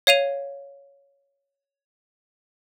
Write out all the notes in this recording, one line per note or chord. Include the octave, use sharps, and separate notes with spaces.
C#5 F5 D#7 F7